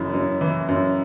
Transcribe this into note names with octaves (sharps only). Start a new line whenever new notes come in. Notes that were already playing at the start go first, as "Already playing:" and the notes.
Already playing: F#2 C#3 E3 E4
F#2
E3
F#2